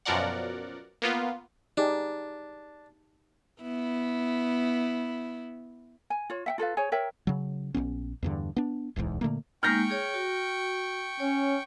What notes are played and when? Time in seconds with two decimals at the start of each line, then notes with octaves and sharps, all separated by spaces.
0.05 F#2 B2 F3 A#4 D5 F#5
1.02 A#3 B3 F4
1.77 D4 D#4 G4 G#4
3.62 B3 E4
6.10 G#5
6.30 F4 C#5
6.46 E5 F#5 G5
6.58 F4 A4 B4 F5
6.77 G#4 C5 C#5 G#5
6.92 A#4 C#5 E5 G5
7.27 C#3 F#3
7.74 A#1 A#2 B3 C#4
8.23 E2 G2 D3
8.56 B3 D4
8.96 D1 B1 E2 G#2
9.21 A#2 D3 A3 A#3
9.63 G#3 A#3 D#4 G5 C#6 F6 G6 A#6
9.90 G#4 C#5
10.14 F#4
11.20 C#4 C#5